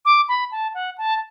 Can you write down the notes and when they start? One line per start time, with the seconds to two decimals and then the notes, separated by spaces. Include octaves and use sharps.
0.05 D6
0.29 B5
0.52 A5
0.74 F#5
0.98 A5